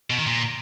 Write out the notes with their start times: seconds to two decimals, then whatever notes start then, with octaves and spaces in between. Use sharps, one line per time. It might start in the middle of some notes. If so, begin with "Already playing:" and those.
0.10 B2
0.18 D#3
0.27 A#2